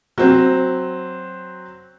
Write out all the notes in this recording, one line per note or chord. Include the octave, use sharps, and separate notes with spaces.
F#3 C4